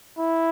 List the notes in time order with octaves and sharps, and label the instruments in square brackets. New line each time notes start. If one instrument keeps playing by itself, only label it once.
[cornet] E4